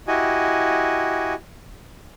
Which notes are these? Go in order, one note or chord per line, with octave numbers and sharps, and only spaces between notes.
E4 F#4 G4 D#5 G#5